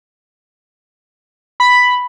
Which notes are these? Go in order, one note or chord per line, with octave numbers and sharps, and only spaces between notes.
B5